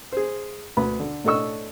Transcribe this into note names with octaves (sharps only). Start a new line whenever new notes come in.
G#4 C5
D2 B4 B5
D3
A2 D4 A4 D#5 C#6 E6